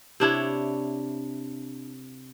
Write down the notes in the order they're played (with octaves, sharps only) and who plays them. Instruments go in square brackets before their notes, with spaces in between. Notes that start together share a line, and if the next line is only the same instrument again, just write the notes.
[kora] C3 D4 E4 C#5